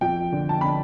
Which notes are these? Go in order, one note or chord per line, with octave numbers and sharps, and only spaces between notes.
F2 G5
D3
A5
D3 B5